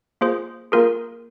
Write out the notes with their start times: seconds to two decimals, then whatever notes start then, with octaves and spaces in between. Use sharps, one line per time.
0.21 A#3 F4 G#4 C5
0.72 A#3 F4 G#4 A#4